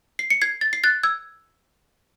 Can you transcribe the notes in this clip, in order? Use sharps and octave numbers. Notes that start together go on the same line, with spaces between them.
C7
C#7
G#6 C7
A6
C7
F#6 A6
E6 G#6